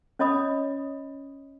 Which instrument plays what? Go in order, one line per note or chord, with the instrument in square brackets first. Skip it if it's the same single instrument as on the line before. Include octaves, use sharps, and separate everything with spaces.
[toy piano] C#4 C#5 D#5 B5 D#6